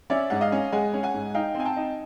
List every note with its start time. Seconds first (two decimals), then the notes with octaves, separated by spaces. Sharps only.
0.10 C#4 D5 E5
0.30 G#2 F#5
0.41 D#5 F5
0.52 C#4
0.72 G#3 F#5 G#5
0.93 C#4
1.03 F#5 G#5
1.14 G#2
1.34 D#4 F5 G5
1.55 C4
1.60 G#5
1.65 G5 A5
1.77 D#4